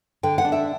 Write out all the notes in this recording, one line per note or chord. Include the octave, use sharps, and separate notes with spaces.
D3 G5
F#5
D4
E5